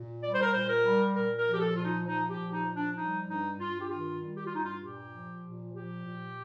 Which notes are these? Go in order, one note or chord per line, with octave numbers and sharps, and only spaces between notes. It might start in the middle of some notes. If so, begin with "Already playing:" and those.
Already playing: A#2
G3 D5
C5
A#4
A#2 C5
A#4
G3
A#2 A#4
A#4
F3
G4
A4
A#2 F4
D#4
F3 D#4
G4
A#2
D#4
F3
D4
G3 D#4
G2 D#4
G2 F4
G4
D#3 F4
G3
G4
F4
G2 D#4
F4
A#2 G4
F3
A#2
F3 G4
A#2